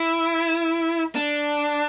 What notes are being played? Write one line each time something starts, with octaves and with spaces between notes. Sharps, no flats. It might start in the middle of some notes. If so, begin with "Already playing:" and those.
Already playing: E4
D4